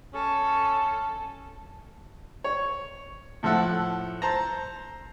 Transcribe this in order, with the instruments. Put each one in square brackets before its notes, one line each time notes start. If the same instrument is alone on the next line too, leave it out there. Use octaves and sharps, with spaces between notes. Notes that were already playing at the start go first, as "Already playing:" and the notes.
[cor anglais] C#4 [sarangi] A4
[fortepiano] C#5
A2 F3 A4 E5 F#5
C5 A5 A#5